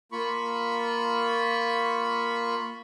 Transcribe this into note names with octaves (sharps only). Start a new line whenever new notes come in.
A#3 F4 B5 C#6